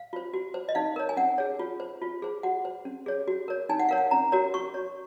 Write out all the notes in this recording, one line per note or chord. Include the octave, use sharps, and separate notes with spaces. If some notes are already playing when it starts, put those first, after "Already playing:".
Already playing: F5
F4 C5
F#4
C5
D#5
D#4 F5
A#4 C#5
G#5
C#4 F#5
G#4 C#5
F4
C5
F4
G#4 C5
F#4 F#5
C5
C#4
G#4 C#5
F#4
A#4 C#5
D#4 G#5
F#5
A#4 C#5 F5
F#5
C#4 A#5
F#4 A#4 C#5
F#4 C#6
C#5